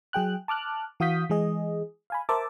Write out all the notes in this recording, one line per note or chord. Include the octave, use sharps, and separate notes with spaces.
F#3 G#4 G5 F#6
A5 D6 F6 F#6
E3 F#4 F5 D#6 G6 B6
E3 G#3 G#4 D#5
F5 G#5 B5
A#4 C5 E5 A5 D6